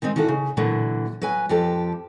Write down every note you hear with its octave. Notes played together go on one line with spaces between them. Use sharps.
D#3 G#3 C4 D#4
D#3 E3 F#4 A4 F5
C#3
A#2 D3 E3 F#3
F#3 B4 G#5
F2 F3 G4 A4